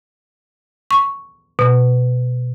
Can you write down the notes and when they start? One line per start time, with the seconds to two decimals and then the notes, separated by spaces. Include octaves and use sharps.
0.91 C#6
1.59 B2